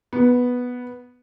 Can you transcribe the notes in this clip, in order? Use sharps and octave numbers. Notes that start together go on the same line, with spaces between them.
B3